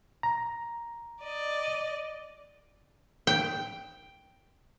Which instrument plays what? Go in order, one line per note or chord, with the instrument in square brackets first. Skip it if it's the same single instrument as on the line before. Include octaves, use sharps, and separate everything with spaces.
[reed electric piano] A#5
[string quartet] D5 D#5
[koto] G5